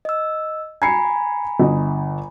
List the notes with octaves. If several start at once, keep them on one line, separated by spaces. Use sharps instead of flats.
D#5 E6
G#5 A#5 B5 G#6 C7 C#7
G1 D#5